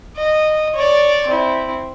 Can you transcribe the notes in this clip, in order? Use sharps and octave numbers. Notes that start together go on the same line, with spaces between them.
D#5
C#5 D5
C4 E4